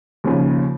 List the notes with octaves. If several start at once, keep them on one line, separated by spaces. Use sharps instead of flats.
D#2 C#3 F3